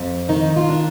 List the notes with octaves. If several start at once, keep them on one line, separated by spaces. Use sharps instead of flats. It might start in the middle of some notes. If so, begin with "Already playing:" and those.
Already playing: F2
D#3 D#4
F4
D4